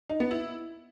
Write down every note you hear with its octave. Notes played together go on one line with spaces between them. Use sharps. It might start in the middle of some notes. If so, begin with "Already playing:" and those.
D#4
B3
E4